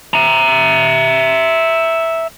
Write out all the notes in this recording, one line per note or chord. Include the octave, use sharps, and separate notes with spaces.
E5 A#5